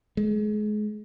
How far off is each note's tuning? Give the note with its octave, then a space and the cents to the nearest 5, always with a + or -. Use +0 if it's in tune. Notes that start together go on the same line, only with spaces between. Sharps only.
G#3 +30